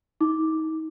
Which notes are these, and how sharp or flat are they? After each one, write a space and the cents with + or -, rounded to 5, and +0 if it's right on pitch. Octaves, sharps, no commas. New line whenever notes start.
D#4 +35 D6 +0